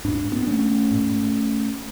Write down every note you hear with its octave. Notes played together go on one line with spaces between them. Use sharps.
G#2 D4
B3 D4
A3 C#4
G#2